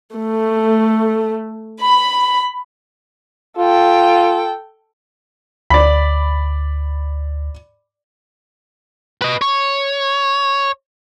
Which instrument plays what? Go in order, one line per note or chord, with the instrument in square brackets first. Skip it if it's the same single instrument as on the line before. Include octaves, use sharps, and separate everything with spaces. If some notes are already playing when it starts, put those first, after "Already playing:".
[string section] A3
B5
[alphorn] F4 [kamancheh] A4 G5
[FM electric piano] D2 [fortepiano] D5 B5
[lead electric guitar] B4 D#5
C#5